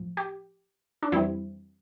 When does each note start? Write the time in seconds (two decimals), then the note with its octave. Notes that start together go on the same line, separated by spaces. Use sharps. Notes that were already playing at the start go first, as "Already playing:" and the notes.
Already playing: A2 F3
0.17 G4
1.03 D4
1.12 F2 E3 G3 C4 E4